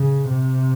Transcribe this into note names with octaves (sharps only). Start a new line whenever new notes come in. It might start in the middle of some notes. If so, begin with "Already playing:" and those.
Already playing: C#3
C3